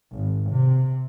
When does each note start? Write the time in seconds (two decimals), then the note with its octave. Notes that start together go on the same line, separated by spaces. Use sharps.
0.12 G#1
0.49 C3